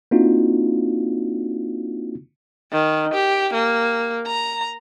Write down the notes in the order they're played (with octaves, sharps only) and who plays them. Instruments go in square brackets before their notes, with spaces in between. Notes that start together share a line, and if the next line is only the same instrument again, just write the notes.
[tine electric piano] A#3 C4 D4 D#4 F4 F#4
[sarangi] D#3
G4
A#3
A#5